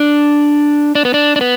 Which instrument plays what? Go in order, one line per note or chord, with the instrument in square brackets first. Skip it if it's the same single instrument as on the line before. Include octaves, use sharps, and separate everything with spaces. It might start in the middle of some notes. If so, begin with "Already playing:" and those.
Already playing: [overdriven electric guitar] D4
D4
B3
D4
D4
B3